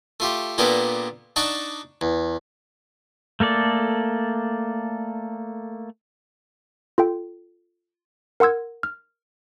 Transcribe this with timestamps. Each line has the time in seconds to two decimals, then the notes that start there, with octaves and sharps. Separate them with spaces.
0.20 A3 F4 G4
0.58 A#2 A#3 B3 D4 G4 A4
1.36 D4 D#4 D5 F#5 A5 C#6
2.01 E2
3.40 A3 A#3 A4 D5
6.98 F4 A4 G5
8.40 A#4 F#5 C6 E6 G#6
8.83 F6